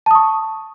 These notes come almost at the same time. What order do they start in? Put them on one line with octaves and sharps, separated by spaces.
A5 D#6 C#6